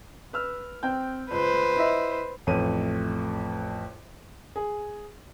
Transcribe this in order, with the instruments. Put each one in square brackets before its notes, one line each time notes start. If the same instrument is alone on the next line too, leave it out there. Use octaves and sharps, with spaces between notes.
[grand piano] B4 E6 F6
C4 G5 G6
[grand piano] C#2 [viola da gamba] B4 C5
[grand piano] E4 D#5 E5
A1 F2 A3 D#7
G#4